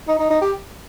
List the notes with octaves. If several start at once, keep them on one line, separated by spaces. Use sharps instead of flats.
D#4
D#4
D#4
G4